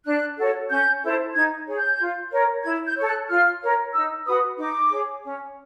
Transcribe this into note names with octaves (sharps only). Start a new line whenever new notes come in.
D4 F#6
F#4 A4 C#5
C#4 G6
E4 A4 C5
D#4 G#6
G#4 C#5
G6
F4
A#4 C#5
E4 G#6
G6
A4 C#5
F#6
F4 F6
A#4 C#5
D#4 E6
F#4 B4 D#6
D#4 D6
G#4 C#5
C#4